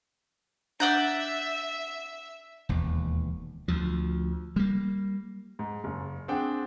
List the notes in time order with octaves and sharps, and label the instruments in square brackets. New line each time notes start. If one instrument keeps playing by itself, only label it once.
[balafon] D4 [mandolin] D5 F#5 G6 [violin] E5
[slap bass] E1 D#2
D2 F3
G3 A#3
[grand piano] G#2
F#1
C4 D4 G#4 F#5 G5